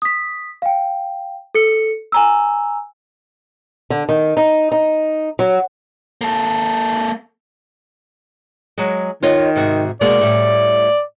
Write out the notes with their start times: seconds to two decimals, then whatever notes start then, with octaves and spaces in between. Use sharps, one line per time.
0.02 D#6 B6
0.62 F5 G5
1.55 A4 C#7
2.12 G#5 A#5 E6
3.90 D3
4.09 D#3
4.37 D#4
4.72 D#4
5.39 F#3
6.21 A#3 A4
8.78 F#3 G#3
9.22 D#3 F4 C#5 D#5
9.56 G#2 C3 F#4
10.01 B2 G#3 A#3 D5
10.21 A2 G3